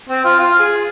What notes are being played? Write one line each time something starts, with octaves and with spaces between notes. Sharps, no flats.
C4
F4
F4
G#4